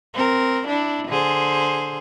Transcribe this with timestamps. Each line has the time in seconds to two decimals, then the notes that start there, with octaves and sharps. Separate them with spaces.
0.14 C4 A#4
0.67 D4 E4
1.08 D3 G#4 C5